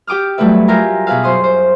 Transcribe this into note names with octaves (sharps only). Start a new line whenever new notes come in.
G4 G5 D6 D#6 F6
F#3 G3 A3 E4 B4 E5
F4 G4 A#4 E5 G#5 A#5
B2 G#4 B4 E5 F5
F#2 C5 C6 D#6
C5